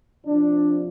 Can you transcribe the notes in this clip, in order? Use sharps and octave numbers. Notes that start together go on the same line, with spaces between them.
C3 F3 D4